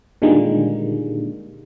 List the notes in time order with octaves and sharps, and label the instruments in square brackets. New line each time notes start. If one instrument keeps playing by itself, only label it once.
[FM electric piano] A#2 D3 D#3 G3 G#3 A#3